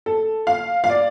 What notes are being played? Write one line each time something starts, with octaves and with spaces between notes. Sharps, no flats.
A4
F5
F5
D5